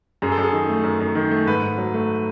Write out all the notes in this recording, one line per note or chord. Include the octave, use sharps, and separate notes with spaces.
F#2 G#4
A4
F#2 G#4
D#3
A3
F#2
F#2
D#3
A3
G#2 B4
G#2
F#3
A3